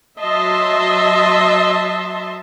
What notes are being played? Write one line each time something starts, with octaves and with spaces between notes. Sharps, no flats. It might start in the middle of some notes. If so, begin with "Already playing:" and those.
F#3 D#5 E5 A5 C6